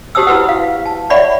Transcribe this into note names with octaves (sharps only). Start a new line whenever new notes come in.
F#4 G4 C5 A5 D#6 E6
E4 F#4 B4 F#5
F5
A5
C#5 D5 E5 F#5 B5 C#6